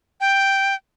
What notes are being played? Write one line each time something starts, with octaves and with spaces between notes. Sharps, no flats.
G5